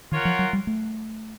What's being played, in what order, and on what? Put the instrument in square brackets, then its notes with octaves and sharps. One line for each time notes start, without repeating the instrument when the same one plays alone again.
[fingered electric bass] D#3 [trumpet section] F4 A#4 C#5 F#5
[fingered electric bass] F3
F#3
G3
A3